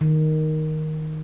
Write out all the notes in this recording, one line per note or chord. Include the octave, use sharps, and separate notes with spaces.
D#3